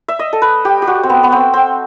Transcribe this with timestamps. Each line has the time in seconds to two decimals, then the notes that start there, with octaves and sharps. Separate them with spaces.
0.08 E5
0.19 D#5
0.33 A4
0.42 B4
0.65 G4
0.82 G4
0.87 F#4
1.03 C4
1.09 B3
1.23 B3
1.32 C4
1.54 C4